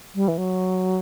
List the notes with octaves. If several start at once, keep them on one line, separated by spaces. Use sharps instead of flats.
G3
E3
F#3